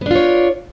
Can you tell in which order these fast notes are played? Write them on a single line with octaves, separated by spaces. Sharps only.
B3 D4 F4 C#5